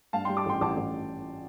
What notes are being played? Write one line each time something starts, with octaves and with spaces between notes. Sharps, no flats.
G2 F5 A5
G3 G5 C6
A5 D6
A1 G5 C6
A1 A5 D6
A1